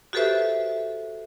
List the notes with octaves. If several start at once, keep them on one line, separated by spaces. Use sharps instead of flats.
F#4 G4 A4 B4 C5 E5